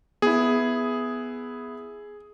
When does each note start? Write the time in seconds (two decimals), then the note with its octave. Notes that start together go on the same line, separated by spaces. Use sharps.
0.22 B3 E4 G#4